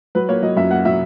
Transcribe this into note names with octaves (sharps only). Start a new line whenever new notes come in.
F#3 B4
A#3 C#5
F#3 D#5
F#2 E5
A#3 F#5
F#3 E5